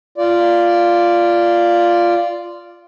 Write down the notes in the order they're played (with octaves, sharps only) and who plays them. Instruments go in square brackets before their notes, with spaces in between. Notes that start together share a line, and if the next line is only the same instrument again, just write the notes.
[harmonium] F4 D5